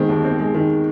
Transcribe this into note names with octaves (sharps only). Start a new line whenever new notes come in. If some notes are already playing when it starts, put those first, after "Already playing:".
Already playing: D#3 G#3 C4
D#2
C4
G#3
D#3